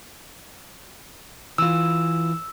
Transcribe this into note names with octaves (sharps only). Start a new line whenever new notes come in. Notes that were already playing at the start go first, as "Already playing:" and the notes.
E3 F4 E6